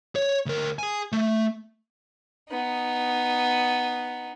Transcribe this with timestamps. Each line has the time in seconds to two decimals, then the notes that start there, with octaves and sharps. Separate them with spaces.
0.15 C#5
0.46 D2 A#4
0.79 G#4 G#5
1.12 A3
2.50 B3 D#4